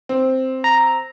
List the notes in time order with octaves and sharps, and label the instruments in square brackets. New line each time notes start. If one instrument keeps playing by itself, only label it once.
[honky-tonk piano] C4
[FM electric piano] A#5